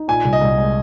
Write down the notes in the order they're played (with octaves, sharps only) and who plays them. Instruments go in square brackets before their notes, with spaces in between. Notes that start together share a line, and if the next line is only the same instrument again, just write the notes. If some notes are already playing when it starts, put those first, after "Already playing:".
Already playing: [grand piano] D#4
[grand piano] A#2 [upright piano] G#5
[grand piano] C2
[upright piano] D#5
[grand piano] C2
G#3